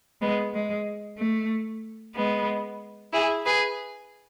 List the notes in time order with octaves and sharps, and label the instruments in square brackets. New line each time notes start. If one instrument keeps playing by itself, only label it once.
[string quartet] G#3 B3
G#3
A3
G#3 B3
E4 G#4
G#4 B4